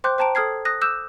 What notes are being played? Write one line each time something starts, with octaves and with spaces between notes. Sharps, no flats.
C5 G5 C6 D6 F#6 G6
C5 G5 A5 A#5 D7
A4 D#6 F6 G#6 C7
D#6 F#6 A#6
D6 E6 F#6 G6 E7